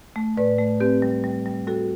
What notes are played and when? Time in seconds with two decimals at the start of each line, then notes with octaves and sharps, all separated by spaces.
0.16 A3
0.37 A2 B4 D5
0.59 A3
0.80 C4 G4 B4
1.02 G3
1.24 G3
1.46 G3
1.67 G3 F#4 A4